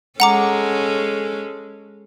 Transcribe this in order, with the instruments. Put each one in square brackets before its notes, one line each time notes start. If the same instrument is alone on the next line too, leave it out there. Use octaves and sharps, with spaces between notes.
[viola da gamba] G#3 C#4 A4 [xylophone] F#5 A#5 D6